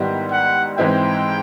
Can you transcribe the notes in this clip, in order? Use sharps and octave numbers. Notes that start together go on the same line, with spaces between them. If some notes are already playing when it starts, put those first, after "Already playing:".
Already playing: G#2 D#3 G3 B3 E4
F#5
G#2 E3 G#3 C4 E4 G5